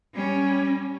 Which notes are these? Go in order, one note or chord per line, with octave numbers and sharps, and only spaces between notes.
G3 C#4